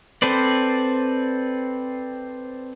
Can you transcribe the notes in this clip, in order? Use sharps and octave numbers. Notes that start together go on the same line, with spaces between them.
C4 A4 B4 C5 D5